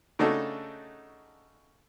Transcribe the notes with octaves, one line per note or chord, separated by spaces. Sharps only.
C#3 A3 D4 D#4 F#4 A4